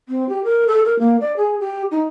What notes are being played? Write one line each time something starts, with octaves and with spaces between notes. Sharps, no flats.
C4
G4
A#4
A4
A#4
A#3
D5
G#4
G4
D#4